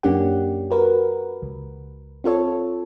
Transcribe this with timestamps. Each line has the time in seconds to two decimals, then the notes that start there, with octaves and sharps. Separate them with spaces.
0.03 F#2 A#3 C#4 D4 G4 F#5
0.71 F#4 A#4 B4
1.42 C#2
2.24 C4 F4 A4 C#5